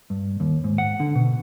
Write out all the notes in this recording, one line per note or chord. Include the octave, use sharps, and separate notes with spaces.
G2
D#2
G#2
F#5
D3
B2